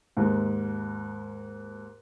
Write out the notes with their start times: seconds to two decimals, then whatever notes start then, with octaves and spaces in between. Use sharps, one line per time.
0.17 D#2 G#2